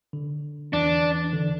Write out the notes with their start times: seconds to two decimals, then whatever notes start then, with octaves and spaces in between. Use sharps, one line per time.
0.13 D3
0.73 E2 E3 D4
1.33 D3